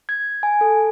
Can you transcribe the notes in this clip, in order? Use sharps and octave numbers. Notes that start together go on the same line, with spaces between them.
G#6
G#5
A4